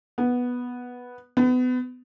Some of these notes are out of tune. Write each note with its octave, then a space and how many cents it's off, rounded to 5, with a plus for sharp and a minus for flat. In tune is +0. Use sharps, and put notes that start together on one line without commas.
B3 -5
B3 +30